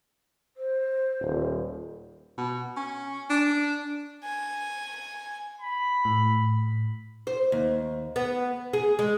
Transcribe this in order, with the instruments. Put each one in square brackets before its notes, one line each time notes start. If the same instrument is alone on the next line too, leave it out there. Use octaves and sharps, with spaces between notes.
[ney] C5
[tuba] D#1
[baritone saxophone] B2
C#4
D4
[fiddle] G#5
[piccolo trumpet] B5
[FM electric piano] A2
[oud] C5
D#2
B3
G#4
G#3